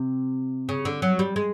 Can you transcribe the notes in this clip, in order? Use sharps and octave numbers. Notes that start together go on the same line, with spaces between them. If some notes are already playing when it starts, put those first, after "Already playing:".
Already playing: C3
C#3
D3
F#3
G3
G#3